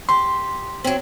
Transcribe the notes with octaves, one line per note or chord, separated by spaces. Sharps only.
G4 C6
F#3 C4